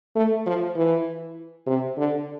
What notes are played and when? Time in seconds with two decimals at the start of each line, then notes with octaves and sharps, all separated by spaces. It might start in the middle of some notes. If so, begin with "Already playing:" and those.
0.16 A3
0.46 F3
0.76 E3
1.67 C3
1.97 D3